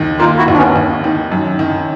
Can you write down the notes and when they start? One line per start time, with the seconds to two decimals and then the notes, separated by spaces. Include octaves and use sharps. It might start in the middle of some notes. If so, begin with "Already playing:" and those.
Already playing: D#2 D#3
0.19 A#3 D#4 F4
0.38 E4 F#4
0.48 D#2
0.53 D4
0.57 B3 C#4
0.76 D#2
1.04 D#3
1.32 F#2
1.59 D#3